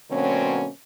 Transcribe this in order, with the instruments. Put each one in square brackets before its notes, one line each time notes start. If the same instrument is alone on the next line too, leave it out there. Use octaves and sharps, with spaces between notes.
[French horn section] B2 D3 F#3 A#3 C4 C#4